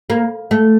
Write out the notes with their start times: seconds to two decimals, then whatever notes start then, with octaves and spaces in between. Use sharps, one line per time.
0.10 A#3
0.51 A3